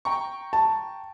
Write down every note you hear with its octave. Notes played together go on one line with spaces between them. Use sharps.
G5 A#5 C#6
A5